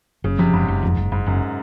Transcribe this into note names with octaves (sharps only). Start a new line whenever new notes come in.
F#1 C#3
C3 F3
F#1 G#2
F#1
F2
F#1
F#1 G#2
F#1 F#2